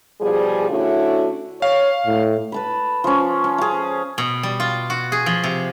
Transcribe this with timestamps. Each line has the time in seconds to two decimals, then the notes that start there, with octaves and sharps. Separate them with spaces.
0.21 B2 F3 G3 G#4
0.70 D3 A3 C#4 D4 E4 F#4
1.62 C#5 F5
2.07 A2
2.52 B4 A5 B5
3.04 F3 C#4
3.44 C#4
3.58 G#4 F5
4.18 B2
4.43 G3
4.60 F4
4.90 F#4
5.12 G#4
5.26 F3
5.43 C3